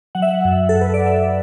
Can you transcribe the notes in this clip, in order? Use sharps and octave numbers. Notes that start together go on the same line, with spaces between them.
F#3 F#5
E5
F#5
F#2
A4
F#2
B4
D5
F#2 E5